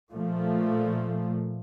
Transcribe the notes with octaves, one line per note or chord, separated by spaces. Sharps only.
A#2 F3 A3